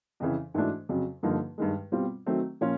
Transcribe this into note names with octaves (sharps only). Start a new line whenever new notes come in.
F2 C#3 E3
G#2 E3 A3 D4 F#4
F2 C#3 F#3
G2 D3 F3 A#3 D#4
G2 D#3 G#3
B2 G3 C4 F4
D#3 F#3 A3 C4
A#2 F3 A#3 C#4 F4